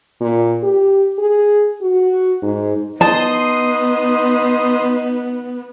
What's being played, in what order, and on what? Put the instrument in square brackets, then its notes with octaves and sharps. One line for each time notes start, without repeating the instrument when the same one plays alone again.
[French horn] A#2
G4
G#4
F#4
G#2
[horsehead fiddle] B3 [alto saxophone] D#4 [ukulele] A5 [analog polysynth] C6 D#6